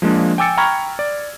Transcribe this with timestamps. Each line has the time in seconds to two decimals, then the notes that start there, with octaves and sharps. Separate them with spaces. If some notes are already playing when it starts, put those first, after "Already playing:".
0.02 F3 G#3 A#3 D4
0.38 G5 G#5 D6 E6 A6 C#7
0.57 G5 A#5 B5 C#6 F6 G#6
0.99 D5